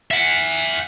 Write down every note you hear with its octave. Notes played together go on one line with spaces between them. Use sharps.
E5 F#5